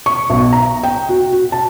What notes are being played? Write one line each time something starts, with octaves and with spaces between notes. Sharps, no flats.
C#6
B1
A#5
G5
F#4
F#4
A5